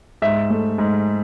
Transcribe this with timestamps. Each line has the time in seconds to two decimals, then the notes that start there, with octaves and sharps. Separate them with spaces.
0.22 G#2 E5
0.50 A3
0.78 G#2